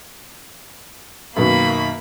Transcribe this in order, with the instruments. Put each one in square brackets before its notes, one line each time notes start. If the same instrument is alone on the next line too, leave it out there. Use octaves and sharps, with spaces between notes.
[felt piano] F#2 B2 D#3 [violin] A#3 B5